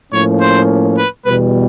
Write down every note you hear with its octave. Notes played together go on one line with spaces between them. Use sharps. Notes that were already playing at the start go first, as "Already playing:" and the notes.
A2 F3 A#3 C#4 C#5
C5
B4
E2 B2 G3 B4